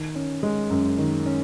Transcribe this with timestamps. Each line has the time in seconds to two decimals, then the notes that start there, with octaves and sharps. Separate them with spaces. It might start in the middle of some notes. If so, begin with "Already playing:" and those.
Already playing: D#3
0.15 C#4
0.43 G#3
0.70 F#2
0.98 D#3
1.26 C#4